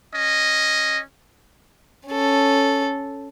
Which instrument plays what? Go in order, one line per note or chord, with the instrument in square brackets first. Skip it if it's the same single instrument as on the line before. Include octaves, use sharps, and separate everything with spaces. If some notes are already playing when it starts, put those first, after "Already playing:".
[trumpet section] C#4 D#5
[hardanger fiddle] C#4 A4